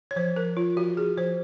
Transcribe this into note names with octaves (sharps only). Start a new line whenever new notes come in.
C#5
F3 C5
F3 A#4
F3 F4
F3 F#4
F3 G#4
F3 C5